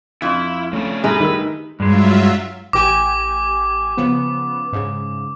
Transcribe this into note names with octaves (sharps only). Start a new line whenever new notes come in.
F2 E4 F4
C#3 A3 C#4 D4
A2 G3 G#3 B4 A#5
D#3 G3 D#4 E6
G2 F#3 G#3 F4 E5
A1 G4 G#5 D6
C#3 F3 B3
G#2 C#3